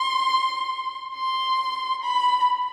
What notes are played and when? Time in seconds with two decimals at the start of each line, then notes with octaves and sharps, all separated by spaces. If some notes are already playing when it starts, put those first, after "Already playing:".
Already playing: C6
1.15 C6
2.03 B5